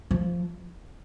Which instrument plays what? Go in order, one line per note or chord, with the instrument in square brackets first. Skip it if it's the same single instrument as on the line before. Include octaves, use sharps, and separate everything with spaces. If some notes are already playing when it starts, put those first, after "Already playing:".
[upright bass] F3